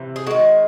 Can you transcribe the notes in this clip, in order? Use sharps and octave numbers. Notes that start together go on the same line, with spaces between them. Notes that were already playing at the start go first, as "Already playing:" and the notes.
Already playing: C3 E3
G#4
D#3 G#3 F#4